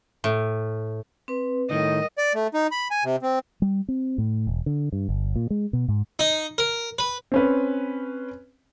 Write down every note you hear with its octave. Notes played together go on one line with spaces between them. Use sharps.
A2
C4 B4
A2 D#3 G3 A#4 D#5
D5
A3
D#4
B5
G#5
C3
C4
G3
C4
A2
E1
D3
G2
G1
A#2
G#3
B2
G#2
D#4
A#4
B4
C4 C#4 B4